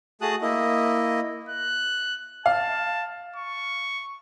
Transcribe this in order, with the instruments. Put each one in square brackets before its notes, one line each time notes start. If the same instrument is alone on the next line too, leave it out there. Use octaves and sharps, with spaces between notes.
[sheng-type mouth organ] A3 F#4 G#4 A5 D#6 F#6
A#3 E4 D#5
[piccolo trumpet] F#6
[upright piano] F5 [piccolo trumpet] A5
[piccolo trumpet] C#6